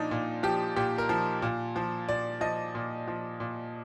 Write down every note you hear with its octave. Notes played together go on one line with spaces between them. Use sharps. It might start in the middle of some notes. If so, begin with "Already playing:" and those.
Already playing: A#2 F3 D4 D#4
A#2
F3 G4
A#2 G4
A#4
F3
A#2
F3
A#2 D5
F3 D#5
A#2
F3
A#2